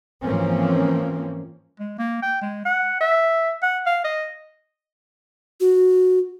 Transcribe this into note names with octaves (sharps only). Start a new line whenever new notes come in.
G#2 E3 F3 A#3 C4 C#4
G#3
A#3
G5
G#3
F#5
E5
F#5
F5
D#5
F#4